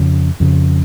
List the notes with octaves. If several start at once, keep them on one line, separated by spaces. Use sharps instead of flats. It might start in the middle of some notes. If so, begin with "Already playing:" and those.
Already playing: F2 C#3
F2 C#3